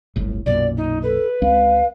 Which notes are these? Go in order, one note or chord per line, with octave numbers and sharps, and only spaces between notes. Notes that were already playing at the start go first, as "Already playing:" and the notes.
D1 G1 A2
B1 F#2 A#2 D5
D#4
A4 B4
C#2 G#3 C4 F5